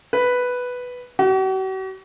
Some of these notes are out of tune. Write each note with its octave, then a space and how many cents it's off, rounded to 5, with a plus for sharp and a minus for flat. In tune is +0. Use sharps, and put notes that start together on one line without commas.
B4 +0
F#4 +45